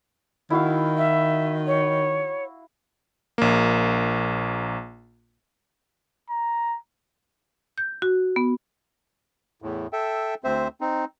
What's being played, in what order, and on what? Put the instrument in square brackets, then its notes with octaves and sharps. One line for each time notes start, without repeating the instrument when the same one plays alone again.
[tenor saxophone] D#3 [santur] E4 F#4 F5
[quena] E5
C#5
[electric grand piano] A#1 A#3
[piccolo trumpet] A#5
[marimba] G6
F#4
B3
[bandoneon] E2 A2
A4 E5 G5
D2 C4 C5 E5
C4 D#4